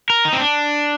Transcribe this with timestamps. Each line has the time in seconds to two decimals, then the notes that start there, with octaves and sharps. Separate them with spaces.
0.10 A#4
0.25 D#4
0.33 C4
0.40 D4